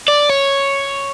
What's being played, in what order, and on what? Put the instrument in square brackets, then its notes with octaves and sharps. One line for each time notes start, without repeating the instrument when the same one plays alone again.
[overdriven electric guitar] D5
C#5